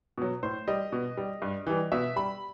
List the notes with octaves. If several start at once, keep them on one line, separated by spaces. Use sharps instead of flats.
B2 F#3
A2 C5
G3 D#5
B2
G3
G2
E3 G3
B2 E5
G3 B5